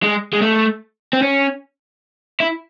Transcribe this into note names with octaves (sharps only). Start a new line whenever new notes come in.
G#3
G#3
A3
C4
C#4
E4